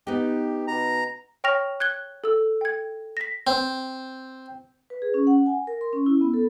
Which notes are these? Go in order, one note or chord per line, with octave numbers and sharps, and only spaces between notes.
B3 D#4 G4
B2 A#5
C#5 G5 C#6 F6 A#6 F7
F#6 G#6 G7
A4 E6
G5 G#6
A#6 B6
C4
B4
G#4
C#4
F#5
G#5
A#4
C6
C#4
E4
B3
A4